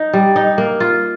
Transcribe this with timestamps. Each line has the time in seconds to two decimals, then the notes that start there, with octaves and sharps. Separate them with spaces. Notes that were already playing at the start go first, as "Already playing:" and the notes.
Already playing: D#4
0.13 G3
0.36 D#4
0.58 A#3
0.80 F4